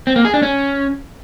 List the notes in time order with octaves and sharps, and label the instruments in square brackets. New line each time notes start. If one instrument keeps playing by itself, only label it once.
[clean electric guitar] C4
A#3
G#4
D4
C#4